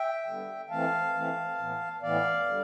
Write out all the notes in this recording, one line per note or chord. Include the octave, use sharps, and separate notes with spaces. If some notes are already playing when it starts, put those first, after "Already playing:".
Already playing: E5 G5
D3 G3 B3
E3 A3 C4 F5 A5
E3 A3 C4
A2 E3 B3
A2 E3 B3 D5 F5
D3 G3